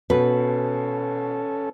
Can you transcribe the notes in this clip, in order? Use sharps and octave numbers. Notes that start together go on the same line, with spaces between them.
B2 C#4 A4 B4